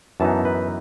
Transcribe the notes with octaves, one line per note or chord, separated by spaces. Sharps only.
F#2 E3 B3 D#4 A5
B4